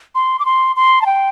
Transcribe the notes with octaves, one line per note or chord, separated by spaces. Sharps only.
C6
D6
C6
C6
A5
G5